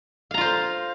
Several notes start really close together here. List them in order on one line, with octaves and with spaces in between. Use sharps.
F5 A#5 F4 C5